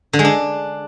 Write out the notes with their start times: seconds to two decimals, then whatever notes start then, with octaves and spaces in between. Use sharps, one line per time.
0.13 D3
0.19 G#3
0.25 D4